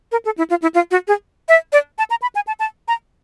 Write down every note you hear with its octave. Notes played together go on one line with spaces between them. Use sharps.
A#4
A4
E4
F4
E4
F4
F#4
G#4
E5
D5
A5
A#5
B5
G#5
A5
A5
A#5